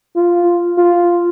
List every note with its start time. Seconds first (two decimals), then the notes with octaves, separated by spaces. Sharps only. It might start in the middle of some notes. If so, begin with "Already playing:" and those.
0.16 F4
0.78 F4